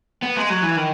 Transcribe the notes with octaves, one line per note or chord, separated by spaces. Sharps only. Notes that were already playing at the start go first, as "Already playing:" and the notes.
B3
G#3
F#3
E3
D#3